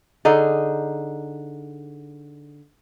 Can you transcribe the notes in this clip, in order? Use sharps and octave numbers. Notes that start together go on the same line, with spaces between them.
D3 D#4 G#4